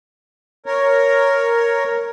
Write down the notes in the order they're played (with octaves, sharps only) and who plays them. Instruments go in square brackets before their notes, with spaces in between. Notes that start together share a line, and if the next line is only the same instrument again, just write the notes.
[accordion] A#4 C#5